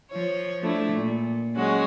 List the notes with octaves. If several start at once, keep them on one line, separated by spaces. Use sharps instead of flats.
F3 C#5
F3 A3 D4 E4
A#2
F#3 G#3 C#4 F#4